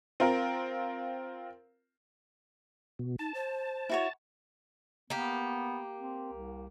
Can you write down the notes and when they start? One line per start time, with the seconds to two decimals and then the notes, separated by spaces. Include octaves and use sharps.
0.20 C4 F4 A#4
2.99 B2
3.19 D#4 A5
3.34 C5
3.89 E4 F#4 C#5
5.10 A#3 B3 G4
5.99 C4
6.33 C2